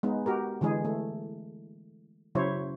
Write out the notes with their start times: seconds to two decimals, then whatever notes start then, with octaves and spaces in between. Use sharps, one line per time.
0.03 G#3 B3 D#4
0.26 F#4 G4 A#4
0.61 D3 E3 G#3 G#4
0.84 A3
2.35 C#3 F#3 E4 C5 C#5